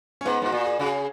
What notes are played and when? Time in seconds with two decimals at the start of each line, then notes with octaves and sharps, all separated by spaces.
0.21 C#4
0.25 G#2 B3
0.42 G#2 F#4
0.52 A#2
0.66 G#4
0.79 C#3 F#4
0.86 G#4